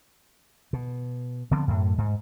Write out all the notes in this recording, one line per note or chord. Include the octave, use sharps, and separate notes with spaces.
B2
D3 F3 B3 C4
F#2 A2
G#2